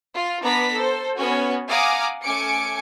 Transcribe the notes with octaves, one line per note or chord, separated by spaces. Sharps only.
F4
B3 D4 B4 A#5 B6
A4 C5
B3 C#4 F#4 C#5 G#5
F5 F#5 G#5 A#5 D6 D#6
A3 C#4 G#5 D6 C#7 D7